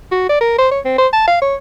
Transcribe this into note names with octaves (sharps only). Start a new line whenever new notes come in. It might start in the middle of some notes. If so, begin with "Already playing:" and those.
F#4
D5
A#4
C5
C#5
C4
C5
A5
F5
C#5